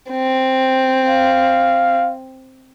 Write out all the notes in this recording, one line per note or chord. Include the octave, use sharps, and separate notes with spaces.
C4
F5